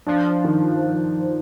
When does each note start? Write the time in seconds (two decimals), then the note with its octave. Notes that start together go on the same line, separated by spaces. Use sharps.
0.07 F3 D4
0.44 D#3